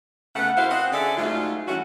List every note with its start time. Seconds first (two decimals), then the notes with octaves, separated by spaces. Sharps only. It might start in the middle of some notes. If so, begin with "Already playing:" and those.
0.35 C#3 A3 B3 F#5
0.56 E4 F#4 A#4 C5 F5
0.70 C4 D#5 F#5
0.92 D3 C#4 G#4 A4 D5 E5
1.17 G#2 F#3 G#3 A3 F4
1.67 E3 G3 A3 C#4 F#4